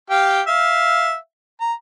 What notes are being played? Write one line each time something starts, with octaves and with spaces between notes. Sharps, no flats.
G4 F5 G5
E5 F5
A#5